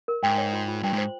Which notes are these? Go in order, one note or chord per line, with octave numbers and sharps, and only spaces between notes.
A#4
G#2 G5
C#5
F4
F4
G2 G5
G#2
C5